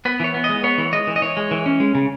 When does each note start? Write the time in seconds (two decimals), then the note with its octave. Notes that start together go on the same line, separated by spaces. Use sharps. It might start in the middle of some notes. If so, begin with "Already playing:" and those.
0.05 B3 B4
0.20 E3 C#5
0.34 B3
0.44 D#5
0.49 G#3
0.64 B3 C#5
0.78 E3
0.93 G#3 D#5
1.07 E3
1.16 D#5
1.22 E3 C#5
1.37 G#3
1.51 E3
1.66 C#4
1.80 G#3
1.95 C#3